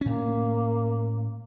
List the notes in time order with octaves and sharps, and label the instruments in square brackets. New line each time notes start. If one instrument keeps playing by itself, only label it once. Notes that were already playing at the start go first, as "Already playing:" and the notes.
[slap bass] A2 C#4 [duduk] A#3